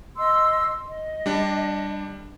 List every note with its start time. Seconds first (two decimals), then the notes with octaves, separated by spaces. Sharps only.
0.17 D#5 C6 E6
0.88 D#5
1.26 G3 D4